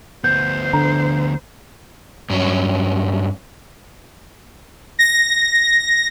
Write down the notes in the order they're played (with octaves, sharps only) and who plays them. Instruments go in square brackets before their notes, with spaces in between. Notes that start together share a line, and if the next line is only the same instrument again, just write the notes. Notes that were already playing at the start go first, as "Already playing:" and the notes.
[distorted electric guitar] D2 B3 [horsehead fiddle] C5 [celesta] G6
[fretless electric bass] D3 [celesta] A#5
[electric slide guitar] G2 F#3 C#4
[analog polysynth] A#6